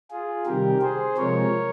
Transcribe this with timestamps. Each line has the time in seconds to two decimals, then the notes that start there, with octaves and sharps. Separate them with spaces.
0.10 F4 G#4
0.46 C3 D#3 G3 G4 A#4
0.81 G#4 C5
1.17 C3 F3 G#3 A#4 C#5